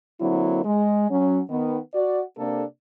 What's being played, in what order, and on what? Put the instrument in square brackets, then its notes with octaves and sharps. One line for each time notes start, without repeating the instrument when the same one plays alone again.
[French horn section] D3 F#3 A#3 C4 E4
G#3
F#3 C#4
D#3 B3
F#4 D5
C3 A#3 D4 A4